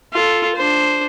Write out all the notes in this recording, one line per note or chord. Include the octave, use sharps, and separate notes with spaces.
F4 A4
D4 C5